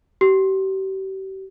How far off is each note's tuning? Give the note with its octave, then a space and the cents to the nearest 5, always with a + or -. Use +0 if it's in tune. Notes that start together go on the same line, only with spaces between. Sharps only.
G4 -40